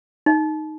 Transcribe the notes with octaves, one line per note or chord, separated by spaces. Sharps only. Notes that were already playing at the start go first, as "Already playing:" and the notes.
D#4